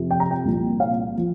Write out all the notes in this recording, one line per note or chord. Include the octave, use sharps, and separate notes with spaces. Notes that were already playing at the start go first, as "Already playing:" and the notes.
Already playing: F2 C3 F3
G5
A#5
G5
C2 A#2 F3
F5
F3